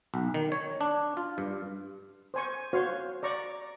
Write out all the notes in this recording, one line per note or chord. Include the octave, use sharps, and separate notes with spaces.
B1
D#3
C#5
D4
F4
G2
C5 G#5 C#6
F#4 C5 C#5 F5
D5 A#5 C#6